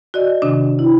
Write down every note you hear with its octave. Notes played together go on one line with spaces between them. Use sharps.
F#4 D5 D#5
C3 D#3 D4
E4